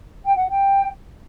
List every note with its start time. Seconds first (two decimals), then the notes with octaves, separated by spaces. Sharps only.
0.25 G5
0.37 F#5
0.50 G5